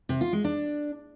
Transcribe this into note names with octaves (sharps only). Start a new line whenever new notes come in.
C3
F4
G#3
D4